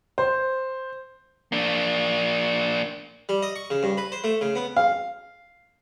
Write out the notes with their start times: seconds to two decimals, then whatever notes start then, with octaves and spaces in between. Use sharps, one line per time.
0.18 C5
1.52 A#3 D4
3.29 G3
3.43 D#5
3.56 C#6
3.70 C#3
3.83 G2
3.97 B4
4.12 C5
4.24 A3
4.41 C#3
4.55 B3
4.76 F5